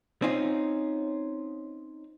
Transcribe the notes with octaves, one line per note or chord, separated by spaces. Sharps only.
C4 C#4 D#4 F4